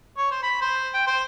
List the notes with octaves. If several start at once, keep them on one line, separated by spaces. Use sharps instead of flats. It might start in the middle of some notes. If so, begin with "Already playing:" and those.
C#5
C5
B5
C5
G5
C5